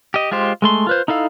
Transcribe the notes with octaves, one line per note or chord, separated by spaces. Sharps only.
G4 D#5
G#3 F4 G4 C5
G#3 A3 C6
F4 B4 C5
D#4 E4 A4 F5